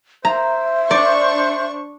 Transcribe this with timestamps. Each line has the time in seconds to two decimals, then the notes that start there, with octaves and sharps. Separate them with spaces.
0.25 C5 E5 A#5
0.91 D4 D5 C#6